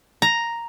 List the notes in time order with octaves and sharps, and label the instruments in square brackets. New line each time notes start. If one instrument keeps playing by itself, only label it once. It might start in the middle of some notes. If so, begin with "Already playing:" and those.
[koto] A#5